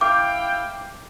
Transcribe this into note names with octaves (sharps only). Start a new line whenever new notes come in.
E4 F5 G5 D6